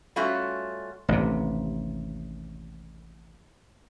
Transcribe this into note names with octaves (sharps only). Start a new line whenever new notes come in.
G3 A3 C#4 F4 F#4 E5
A1 D#2 C3